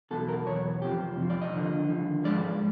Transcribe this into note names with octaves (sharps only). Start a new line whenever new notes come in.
E2 B2 F#3 A4
A#4
E2 B2 F#3 C#5
F2 C3 F3 G4
F2 C3 F3
D5
D#5
D#2 D3 F3
D#2 D3 F3
G#2 F3 G#3 D5